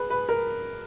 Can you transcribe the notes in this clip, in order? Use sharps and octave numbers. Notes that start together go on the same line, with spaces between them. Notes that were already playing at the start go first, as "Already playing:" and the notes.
Already playing: G#4 B4
B4
A#4